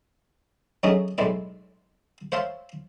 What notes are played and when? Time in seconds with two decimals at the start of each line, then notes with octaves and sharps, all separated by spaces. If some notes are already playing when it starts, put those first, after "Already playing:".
0.83 F#3 A3 C#4 D#4 G#4 D#5
1.18 B1 A2 G#3 E4 D5
2.32 C5 C#5 E5 F5 A5 C6